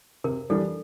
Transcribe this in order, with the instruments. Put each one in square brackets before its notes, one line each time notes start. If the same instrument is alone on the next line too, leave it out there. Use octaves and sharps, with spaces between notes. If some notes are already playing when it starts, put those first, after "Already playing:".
[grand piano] C3 [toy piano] A#4
[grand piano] E3 G3 D4 [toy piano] A4